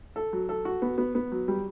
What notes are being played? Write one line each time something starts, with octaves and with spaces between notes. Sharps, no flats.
A4
F#3
A4
F#4
B3
B3
B3
F#3
G3